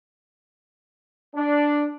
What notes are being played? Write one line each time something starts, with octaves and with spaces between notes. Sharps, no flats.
D4